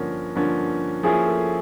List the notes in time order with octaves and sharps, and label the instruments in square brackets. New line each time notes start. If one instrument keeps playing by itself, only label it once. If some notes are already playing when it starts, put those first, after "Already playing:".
Already playing: [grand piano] G2 D3 F3 A#3 C#4 [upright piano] A#4
[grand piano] G2 D3 F3 A#3 C#4
[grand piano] F3 A#3 C#4 E4 [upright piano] G#4
[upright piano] A4